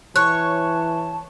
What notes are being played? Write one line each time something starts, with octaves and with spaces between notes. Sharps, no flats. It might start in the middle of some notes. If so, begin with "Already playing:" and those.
E3 C#5 A5 F#6